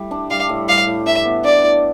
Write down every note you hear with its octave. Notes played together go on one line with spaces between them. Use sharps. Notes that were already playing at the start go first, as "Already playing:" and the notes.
Already playing: G3 A3 E4
D4
G3 F5
A2
G3 F5
A2
D4 E5
B3
D4 D5
A2